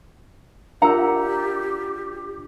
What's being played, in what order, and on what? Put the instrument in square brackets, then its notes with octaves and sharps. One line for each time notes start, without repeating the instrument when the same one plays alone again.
[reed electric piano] D4 F4 E6 [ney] G4 [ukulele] A#4 F#5 A#5